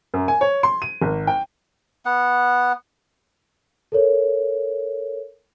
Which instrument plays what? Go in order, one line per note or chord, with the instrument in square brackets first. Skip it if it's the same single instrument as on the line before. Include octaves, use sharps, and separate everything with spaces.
[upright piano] F#2
G#5
C#5
C6
D#7
G#1
G5
[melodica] B3 F#5
[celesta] A4 A#4 C#5